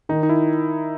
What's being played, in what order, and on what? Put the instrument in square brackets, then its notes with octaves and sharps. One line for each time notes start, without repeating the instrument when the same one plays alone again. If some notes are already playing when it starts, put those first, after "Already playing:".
[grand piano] D#3 [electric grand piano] D#4
[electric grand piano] D#4
E4